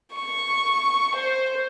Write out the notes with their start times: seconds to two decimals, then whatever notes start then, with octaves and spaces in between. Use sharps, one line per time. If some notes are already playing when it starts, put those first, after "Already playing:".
0.13 C#6
1.16 C5